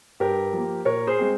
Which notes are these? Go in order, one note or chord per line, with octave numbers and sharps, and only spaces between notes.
G2 G4 A#4
F3 A#3
A#2 A#4 C#5
G#4 C5
G#3 C4